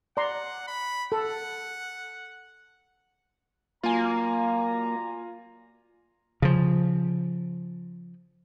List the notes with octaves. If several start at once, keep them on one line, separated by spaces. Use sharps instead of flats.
D5 F#5 A#5 C6
B5
A4 F#5
F#3 A#3 F4 D5 G#5 A#5
C#3 F3